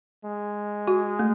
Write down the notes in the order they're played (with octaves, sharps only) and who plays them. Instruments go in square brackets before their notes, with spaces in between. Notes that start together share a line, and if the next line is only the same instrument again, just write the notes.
[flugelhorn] G#3
[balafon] F#4
A3